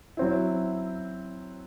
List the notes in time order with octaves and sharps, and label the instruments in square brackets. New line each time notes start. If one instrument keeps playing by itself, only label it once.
[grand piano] F#3 C4 E4